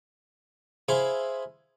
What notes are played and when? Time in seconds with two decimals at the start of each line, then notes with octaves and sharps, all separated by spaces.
0.88 E4 G#4 C5 E5 F5 C6